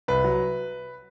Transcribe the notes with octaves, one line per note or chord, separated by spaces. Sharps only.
C2 B4
F#3